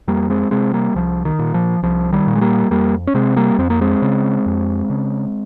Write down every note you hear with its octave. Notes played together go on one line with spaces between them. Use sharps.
F2 G3 A#3
G#3 C4
C3 G#3 C4
G3 A#3
C2 F3
D#3
A#2
F3
C2 F3
D#3 G3
A#2
G#3
G3 A#3
F2 G3 A#3
C#4
C3 G#3 C4
G3 A#3
F2 C4
A#3
G#3 C4
C#3
F2
C#3